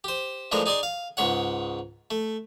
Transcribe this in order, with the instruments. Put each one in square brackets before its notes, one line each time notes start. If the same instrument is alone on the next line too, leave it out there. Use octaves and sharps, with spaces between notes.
[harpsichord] G4 C5
E3 F3 G#3 A3 D4 A#4
D#4 G#4 D5 G#5 C6 D6
F5
C#2 G#2 C#5 F#5
A3